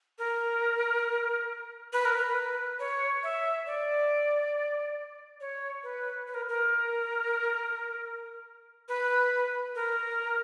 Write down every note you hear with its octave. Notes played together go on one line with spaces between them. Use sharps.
A#4
B4
A#4
B4
C#5
E5
D5
C#5
B4
B4
A#4
A#4
B4
A#4